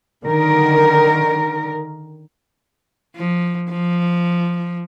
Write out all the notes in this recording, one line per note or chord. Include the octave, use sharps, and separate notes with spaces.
D3 D#3 A#4
F3
F3